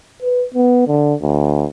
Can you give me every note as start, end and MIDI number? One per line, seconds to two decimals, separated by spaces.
0.23 0.46 71
0.55 0.83 59
0.88 1.14 50
1.21 1.66 38